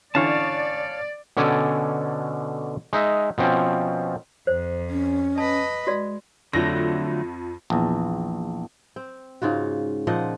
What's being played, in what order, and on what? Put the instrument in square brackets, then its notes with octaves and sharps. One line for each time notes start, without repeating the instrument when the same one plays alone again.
[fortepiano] D3 E3 C#4 [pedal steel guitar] C#5 F5 A5 [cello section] D5
[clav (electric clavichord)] B2 D3 C#4 A4 D5 G#5
G#3 D#4 E5
B2 F3 C4 C#4
[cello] F2 [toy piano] C5
[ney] C#4
[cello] B4 D#5 [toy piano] A5
[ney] G#3 [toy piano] F#4 D5
[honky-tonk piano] F2 A#6 [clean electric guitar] D3 F#3 A3
[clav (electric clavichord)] A#1 E2
[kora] C4
G#2 C#3 F4 F#4
A#2 F3 D#5 F#5